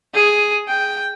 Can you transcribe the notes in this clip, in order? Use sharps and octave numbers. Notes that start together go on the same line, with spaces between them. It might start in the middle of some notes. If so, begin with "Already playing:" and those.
G#4
G5